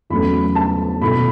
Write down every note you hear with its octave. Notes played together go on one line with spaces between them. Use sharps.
E2 C#3 F#3 A3 B5
A5
B2 A3 E4 B5